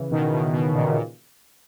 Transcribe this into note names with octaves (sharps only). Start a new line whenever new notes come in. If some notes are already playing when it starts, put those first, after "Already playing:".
Already playing: C#3 E3
B2 D#3
B2
B2
A#2 C#3
A#2